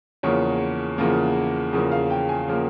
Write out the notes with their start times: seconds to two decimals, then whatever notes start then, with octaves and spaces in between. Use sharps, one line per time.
0.23 E2 C#3 F3 A#3 C#5
0.98 E2 C#3 F3 A#3
1.73 E2 C#3 F3 A#3
1.92 F5
2.10 G5
2.29 G#5
2.48 C#3 F3 A#3